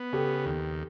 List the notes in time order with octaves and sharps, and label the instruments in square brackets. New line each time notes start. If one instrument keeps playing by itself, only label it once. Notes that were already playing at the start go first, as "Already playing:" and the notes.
Already playing: [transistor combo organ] B3
[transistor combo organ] C#3 [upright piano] G4 A4
[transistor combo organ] D#2